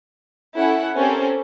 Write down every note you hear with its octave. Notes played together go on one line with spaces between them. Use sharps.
C#4 E4 A4 F#5
C4 C#4 G4 A4 A#4 C5